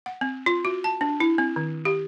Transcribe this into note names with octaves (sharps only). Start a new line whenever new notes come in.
F#5
C4
F4
F#4
A5
D4
E4
C4
D#3
G4